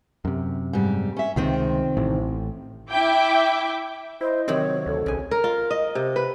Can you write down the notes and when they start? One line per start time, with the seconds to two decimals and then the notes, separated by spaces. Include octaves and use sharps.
0.25 F#2 C3
0.73 G#2 G3
1.17 C#4 E5
1.36 C#2 C3 D#3 C4
1.97 A1 A2
2.88 E4 E5 G5 D6
4.21 E4 C5 D#5
4.48 C3 D#3 F#3 C4 C#5
4.86 D2 A4
5.06 B1 C#3 G#5
5.31 A#4
5.44 F4
5.71 D#5
5.95 C3
6.16 B4